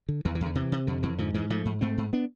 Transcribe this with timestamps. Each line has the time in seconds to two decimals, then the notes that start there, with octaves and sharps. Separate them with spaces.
0.09 D3
0.25 E2 E3
0.35 E3
0.41 E2 D3
0.55 C3 E3
0.72 C3
0.87 F2 D3
1.03 F2 E3
1.18 G#2 D3 F3
1.34 G#2 E3 G#3
1.50 G#2 F3 A3
1.65 G#2
1.81 G#2 A3 C4
1.98 G#2
2.13 B3 D4